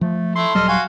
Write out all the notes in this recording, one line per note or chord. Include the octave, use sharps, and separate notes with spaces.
F3 A3
A3 E4 C6
D#1 F#3 G3 A4 D#5 F6
F#4 F5 G#5